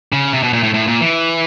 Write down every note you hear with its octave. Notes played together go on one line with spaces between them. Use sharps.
C#3
C3
B2
A#2
A2
A2
A#2
E3